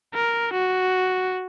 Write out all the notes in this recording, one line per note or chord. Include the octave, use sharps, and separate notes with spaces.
A#4
F#4